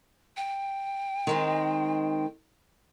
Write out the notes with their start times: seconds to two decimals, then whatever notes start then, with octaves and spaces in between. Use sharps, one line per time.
0.37 G5
1.27 D#3 G#3 C4